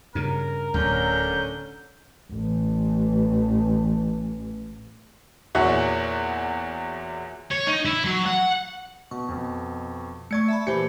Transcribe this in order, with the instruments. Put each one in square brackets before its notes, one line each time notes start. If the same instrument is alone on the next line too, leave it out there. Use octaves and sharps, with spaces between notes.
[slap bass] G2 C#3 [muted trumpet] A#4
[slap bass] D1 [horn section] D3 C#4 [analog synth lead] G6
[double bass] A1 E3
[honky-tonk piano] E2 A#2 E4 F#4 G#4 C#5
[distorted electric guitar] C#5
D#4
E4
F#3
F#5
[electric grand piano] B2 [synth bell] C#6
[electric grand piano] F2 B2
[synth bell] A3 D5 C#6 [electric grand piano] G#6 C#7
[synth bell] E5 A5 B5
[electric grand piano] A#2 E3 C#7 [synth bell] G4 C5